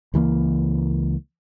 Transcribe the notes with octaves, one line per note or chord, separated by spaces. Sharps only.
C#2 E3 F#3 A#3